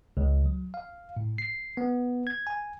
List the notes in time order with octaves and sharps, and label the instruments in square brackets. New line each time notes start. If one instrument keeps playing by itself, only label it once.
[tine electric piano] C#2
F#3
F5
A2
C7
B3
G#6
G#5